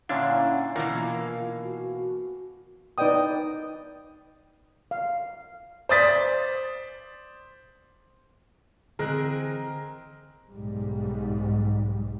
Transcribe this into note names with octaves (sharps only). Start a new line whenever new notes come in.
A#2 D3 C#4 D4 E4 F5 F#5
B2 E3 A#3 F4 F5
F#4
D#4 B4 D5 D#5 G5 D#6
F5
C5 D5 D#6 A6 B6
D3 E3 C4 G#4 A#4 D#5 F#6
B1 G#2 G3